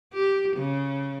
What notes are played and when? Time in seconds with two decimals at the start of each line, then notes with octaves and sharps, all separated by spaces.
0.14 G4
0.57 C#3